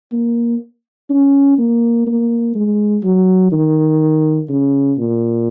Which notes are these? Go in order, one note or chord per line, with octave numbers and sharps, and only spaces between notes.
A#3
C#4
A#3
A#3
G#3
F#3
D#3
C#3
A#2